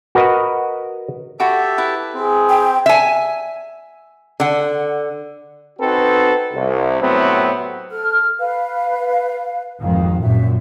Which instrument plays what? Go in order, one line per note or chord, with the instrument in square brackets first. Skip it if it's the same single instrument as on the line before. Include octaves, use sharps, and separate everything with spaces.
[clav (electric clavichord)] F#4 A#4 B4 D#5
[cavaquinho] F#4 B5 D6 [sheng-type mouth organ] G4 A4 E5
[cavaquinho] E4 B4
[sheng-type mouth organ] C4 [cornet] G#4
[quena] G5
[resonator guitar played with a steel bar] E5 G#5
D3 F#5
[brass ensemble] C4 D#4 F#4 A4 B4
C2
A2 C3 F#3 B3 C4
[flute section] A4 F6
B4 F5
[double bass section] G#1 F2 D#3 [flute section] F5
[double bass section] F#2 A#2 [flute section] E5